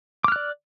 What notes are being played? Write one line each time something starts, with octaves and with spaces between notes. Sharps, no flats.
D5 D6 F6 F#6